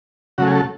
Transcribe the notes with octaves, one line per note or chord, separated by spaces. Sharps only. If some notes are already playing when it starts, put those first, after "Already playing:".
C#3 F#3 A3 F#4
G#4
A4